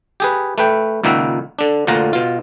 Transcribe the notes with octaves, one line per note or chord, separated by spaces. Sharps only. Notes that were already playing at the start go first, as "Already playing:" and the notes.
G4 G#4 B4
A3 B4 G5
C#2 A#2 D#3 A#3 E5 F#5
D3 D4
D2 A#2 D3 F4 F#5 A#5
B2 F4